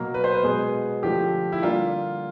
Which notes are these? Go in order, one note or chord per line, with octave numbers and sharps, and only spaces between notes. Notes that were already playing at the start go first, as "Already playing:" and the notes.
Already playing: B2 F#3 A#3 A#4
B4
C5
B4
B2 G#3 B3 G#4
D3 F3 A3 G4
E4
D3 G3 A#3 F4